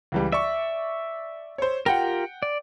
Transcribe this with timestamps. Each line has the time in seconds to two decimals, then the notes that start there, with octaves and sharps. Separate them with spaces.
0.12 C#2 E3 G3
0.32 D5 E5 C#6
1.58 C5 C#5
1.86 F4 G4 A#4 F#5 G5
2.43 D5